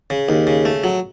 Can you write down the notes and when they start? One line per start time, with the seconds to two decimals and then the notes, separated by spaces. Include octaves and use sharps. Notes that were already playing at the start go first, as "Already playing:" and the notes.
0.10 C#3
0.29 D#2
0.47 C#3
0.65 A3
0.84 F#3